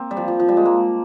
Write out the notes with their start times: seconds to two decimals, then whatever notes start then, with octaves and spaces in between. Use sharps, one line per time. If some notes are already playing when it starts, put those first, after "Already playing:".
Already playing: A#3 C4
0.11 G3
0.17 F3
0.28 F3
0.40 F3
0.48 G3
0.57 G#3
0.65 A#3